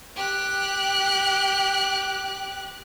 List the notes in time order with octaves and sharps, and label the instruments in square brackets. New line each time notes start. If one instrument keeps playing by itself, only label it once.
[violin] G4 F#6